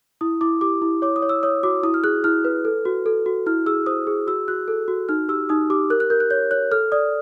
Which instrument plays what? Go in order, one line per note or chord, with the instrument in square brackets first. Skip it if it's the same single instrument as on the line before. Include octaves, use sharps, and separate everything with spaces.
[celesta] E4 D#6
E4 D6
G4 D6
E4
C#5 D6
D#6
C#5
E6
C#5 D#6
F#4 D6
E4 D#6
F6
G#4 F#6
E4 F6
B4
A4
F#4
A4
F#4
E4 F6
G#4 E6
C5 D#6
G#4
F#4 E6
F#4 F#6
A4
F#4
D#4 F6
G4 E6
D#4 D#6
G4 D6
A#4 F#6
F#6
A#4 G6
F#6
C#5 G6
C#5 F#6
A4 F6
D5 D#6